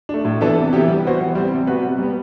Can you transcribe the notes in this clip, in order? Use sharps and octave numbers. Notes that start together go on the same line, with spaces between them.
A3 D4
A2
E3 B3 D4 A4
C3
E3 B3 E4 G4
G3
B3 F#4 C5
E3
G3 C4
C3
G3 B3 F#4 B4
C3
G3 B3